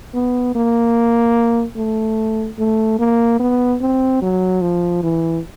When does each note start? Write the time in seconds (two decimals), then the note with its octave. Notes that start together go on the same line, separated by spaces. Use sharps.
0.14 B3
0.55 A#3
1.77 A3
2.59 A3
2.99 A#3
3.40 B3
3.81 C4
4.22 F#3
4.62 F3
5.03 E3